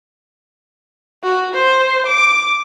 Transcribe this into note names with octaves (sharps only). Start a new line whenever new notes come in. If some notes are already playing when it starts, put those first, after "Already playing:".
F#4
C5
D6